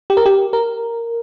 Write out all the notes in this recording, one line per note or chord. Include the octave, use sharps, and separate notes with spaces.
G4
A#4
G4
A#4